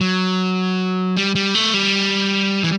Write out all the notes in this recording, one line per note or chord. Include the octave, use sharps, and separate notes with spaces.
F#3
G3
G3
A3
G3
E3